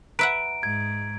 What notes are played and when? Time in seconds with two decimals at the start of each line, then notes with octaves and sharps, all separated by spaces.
0.19 B4 E5 F#5 A#5 D7
0.63 G#2 G#6